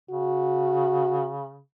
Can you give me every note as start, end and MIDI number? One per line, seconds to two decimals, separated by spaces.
0.10 1.61 49
0.10 1.33 66